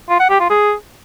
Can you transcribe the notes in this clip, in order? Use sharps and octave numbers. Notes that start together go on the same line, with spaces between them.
F4
F#5
G4
F4
G#4